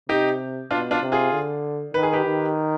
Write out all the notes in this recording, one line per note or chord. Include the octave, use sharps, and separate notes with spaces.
C3 D#4 G4
B2 D4 F4
D4 F4
C3
F4 G#4
D3
D#3 B4
G#4
G4 B4
D#3